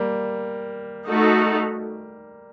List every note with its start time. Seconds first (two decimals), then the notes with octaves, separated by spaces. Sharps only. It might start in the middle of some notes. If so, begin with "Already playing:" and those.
Already playing: G3 A#3
1.07 A3 D#4 F#4 A4